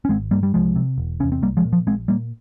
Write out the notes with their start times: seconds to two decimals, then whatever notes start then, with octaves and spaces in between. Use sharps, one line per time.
0.05 C#4
0.09 G#1 G#3 C4
0.31 G2 G3 A#3
0.43 G3
0.54 C2 F3 G#3
0.76 C3
0.98 E1
1.20 E2 C3 C#4
1.32 C4
1.42 C2 G3 A#3
1.57 F3 G#3
1.65 A#2
1.73 F3
1.87 A#1 G#3 C4
2.08 A#2 G3 A#3